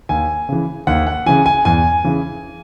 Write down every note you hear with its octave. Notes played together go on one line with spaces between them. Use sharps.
D#2 G#5
C#3 E3
D#2 F#5
F#5
C#3 E3 G#5
G#5
E2 G#5
C#3 E3